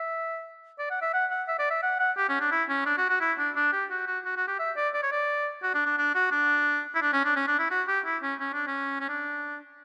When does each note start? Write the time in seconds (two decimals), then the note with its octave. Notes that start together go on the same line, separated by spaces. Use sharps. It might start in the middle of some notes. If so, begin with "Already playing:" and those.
Already playing: E5
0.79 D5
0.90 F#5
1.02 E5
1.13 F#5
1.30 F#5
1.48 E5
1.59 D5
1.70 E5
1.83 F#5
2.00 F#5
2.17 G4
2.29 C#4
2.40 D4
2.52 E4
2.69 C#4
2.86 D4
2.98 F#4
3.09 F#4
3.20 E4
3.38 D4
3.56 D4
3.73 G4
3.90 F#4
4.07 F#4
4.25 F#4
4.37 F#4
4.48 G4
4.59 E5
4.76 D5
4.94 D5
5.03 C#5
5.12 D5
5.63 F#4
5.74 D4
5.86 D4
5.98 D4
6.15 F#4
6.32 D4
6.95 E4
7.02 D4
7.13 C#4
7.24 D4
7.36 C#4
7.48 D4
7.59 E4
7.71 F#4
7.88 G4
8.06 E4
8.23 C#4
8.40 C#4
8.54 D4
8.67 C#4
9.00 C#4
9.09 D4